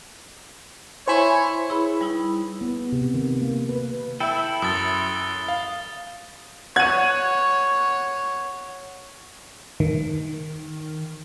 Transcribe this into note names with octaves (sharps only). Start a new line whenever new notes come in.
E4 C5 C#5 G#5
E4 G#4 B4 C#5 B5
G3 D#4 E4
B3
C3
D#3
A#3
B4
E4 A4 E5 G5
F#2 D#6 A6 G7
F5
C#5 F#5 G#6 D#7
D#3